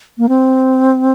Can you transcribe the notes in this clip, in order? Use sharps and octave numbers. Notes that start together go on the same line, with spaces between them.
A#3
C4